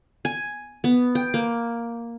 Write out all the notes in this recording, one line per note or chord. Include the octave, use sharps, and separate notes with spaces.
G#5
B3
G5
A#3